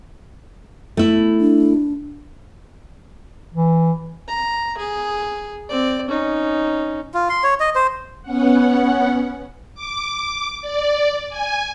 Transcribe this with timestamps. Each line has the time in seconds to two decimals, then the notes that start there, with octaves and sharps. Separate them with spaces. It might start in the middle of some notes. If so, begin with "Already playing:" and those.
0.97 A3 E4
1.40 D4
3.55 E3
4.28 A#5
4.77 G#4
5.69 C4 D5
6.08 C#4 D#4
7.14 F4
7.29 C6
7.44 C#5
7.60 D#5
7.75 C5
8.22 B3 C#4 F#5
9.75 D6
10.62 D5
11.30 G#5